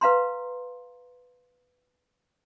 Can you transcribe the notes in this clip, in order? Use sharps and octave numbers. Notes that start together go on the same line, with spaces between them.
B4 F5 A#5 C6